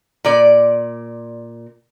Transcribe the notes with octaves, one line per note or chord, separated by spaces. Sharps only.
A#2 D5